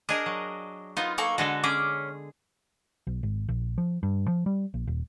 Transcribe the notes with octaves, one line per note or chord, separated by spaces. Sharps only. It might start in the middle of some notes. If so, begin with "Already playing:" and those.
D4 G#4 A#4 D#5
F#3
B3 D#4 F4
A#3 A4 C#6
D3 G#3 F#4 A4
C#4 G#4 D6
B1
G#1
A#1
F3
G2
F3
G3
A#1
D#1